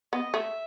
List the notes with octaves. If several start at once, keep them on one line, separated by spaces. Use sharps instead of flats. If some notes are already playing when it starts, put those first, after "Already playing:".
B3 D#5
A3 E5